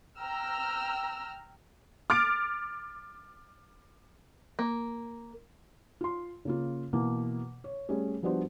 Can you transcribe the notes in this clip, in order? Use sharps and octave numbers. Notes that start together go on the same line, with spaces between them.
G5 A#5 E6 F6
D6 F6 A6 D7
A#3
F4 C6
C#3 A#3 F4
B2 E3 A#3
C#5
G3 A3 C#4 G#4
F3 G3 B3 D4 F#4 C5